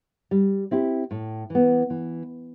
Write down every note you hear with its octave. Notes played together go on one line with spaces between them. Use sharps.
G3
C4 E4 G4
A2
E3 B3
E3